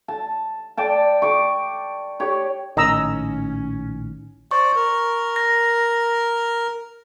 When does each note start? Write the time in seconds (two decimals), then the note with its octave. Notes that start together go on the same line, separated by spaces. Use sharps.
0.08 A5
0.77 D5 G5 A5
1.22 C#6 D6
2.20 G4 C#5
2.77 A#1 A2 D#3 C#4 D#5 A#5 E6
4.51 C5 D5 C#6
4.75 A#4
5.36 A#6